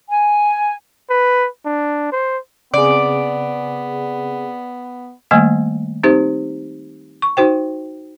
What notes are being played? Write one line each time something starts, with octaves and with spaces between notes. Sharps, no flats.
G#5
B4
D4
C5
C#3 B3 C4 G#4 D5
D#3 G3 A3 A#3 D#5 G#5
C4 D#4 G4 C5
C#6
D#4 F#4 C5 G5